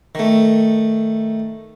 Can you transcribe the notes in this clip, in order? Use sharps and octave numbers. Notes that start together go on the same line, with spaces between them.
D#3 A3